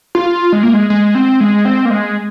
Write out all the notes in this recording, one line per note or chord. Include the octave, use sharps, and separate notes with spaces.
F4
G#3
A#3
G#3
G#3
C4
G#3
C4
A#3
G#3